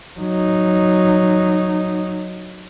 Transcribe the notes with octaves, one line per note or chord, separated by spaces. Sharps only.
F#3 D#4